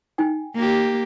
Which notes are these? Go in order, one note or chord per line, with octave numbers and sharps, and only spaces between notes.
D#4 G5 G#5
A#3 G4